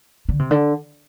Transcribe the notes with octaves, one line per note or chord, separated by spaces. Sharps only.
D3
C3
D3